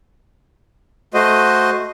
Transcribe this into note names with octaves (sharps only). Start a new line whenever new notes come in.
A3 F#4 C5 D#5